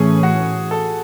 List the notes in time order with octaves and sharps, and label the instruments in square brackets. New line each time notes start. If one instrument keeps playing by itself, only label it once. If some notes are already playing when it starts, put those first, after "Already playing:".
Already playing: [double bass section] A2 E3 A3 C#4 [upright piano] G#4
[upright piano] F#4
A4